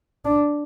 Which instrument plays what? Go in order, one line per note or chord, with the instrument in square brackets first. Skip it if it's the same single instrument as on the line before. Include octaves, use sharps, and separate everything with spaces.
[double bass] D4